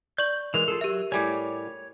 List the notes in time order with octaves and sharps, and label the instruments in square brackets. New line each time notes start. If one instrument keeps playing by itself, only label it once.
[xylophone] D5 C#6 F#7 [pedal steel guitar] G6
[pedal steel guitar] E3 G#3 [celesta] A#4 F7
[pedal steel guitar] F4 G#4 A4
[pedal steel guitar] F#3 E6 [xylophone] G4 E5
[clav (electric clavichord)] A2 G3 G#5 [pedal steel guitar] C#5 D6